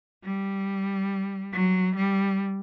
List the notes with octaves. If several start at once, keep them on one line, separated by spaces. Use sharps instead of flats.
G3
F#3
G3